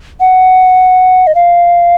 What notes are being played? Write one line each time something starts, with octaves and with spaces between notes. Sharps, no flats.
F#5
D#5
F5